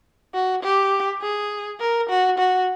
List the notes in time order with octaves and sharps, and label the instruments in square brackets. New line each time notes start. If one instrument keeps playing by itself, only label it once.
[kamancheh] F#4
G4
G#4
A#4
F#4
F#4